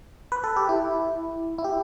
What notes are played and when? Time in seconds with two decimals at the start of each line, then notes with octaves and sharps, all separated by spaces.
0.32 B4
0.44 A4
0.56 G4
0.69 E4
1.58 E4
1.64 G4